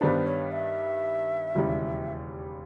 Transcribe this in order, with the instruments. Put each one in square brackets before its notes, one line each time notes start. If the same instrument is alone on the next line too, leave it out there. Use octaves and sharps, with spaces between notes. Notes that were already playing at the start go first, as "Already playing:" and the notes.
[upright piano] G2 D#3 G3 B3 D4 [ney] C5
[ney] C#5
E5
[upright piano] E1 D#2 C#3 E3 G3